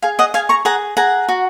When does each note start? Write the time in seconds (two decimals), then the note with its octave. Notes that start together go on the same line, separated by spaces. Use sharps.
0.02 G#4 F5
0.19 D#5 F#5
0.34 G#4 F5 G#5
0.49 A#5 C#6
0.65 G#4 F#5 A#5
0.97 G#4 F#5 A#5
1.28 F#4